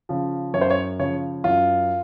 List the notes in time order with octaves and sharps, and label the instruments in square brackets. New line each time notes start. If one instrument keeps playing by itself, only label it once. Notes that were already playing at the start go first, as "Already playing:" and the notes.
[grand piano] C#3 F3
F#2 C#5
C5
C#5
C#3 F3 C#5
F#2 F4